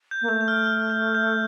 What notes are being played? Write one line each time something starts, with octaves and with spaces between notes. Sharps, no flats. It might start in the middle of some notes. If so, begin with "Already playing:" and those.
G6
A#3
A3 G6
G6
F6
F6
G6
G6